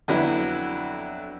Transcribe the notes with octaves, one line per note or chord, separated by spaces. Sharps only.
F2 D3 F#3 B3 E4